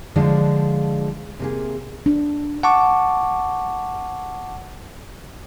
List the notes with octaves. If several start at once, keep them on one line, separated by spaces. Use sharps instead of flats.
D3 F3 G#3 D4 F4
C3 A#3 G#4
D4
F#5 A5 C#6 D6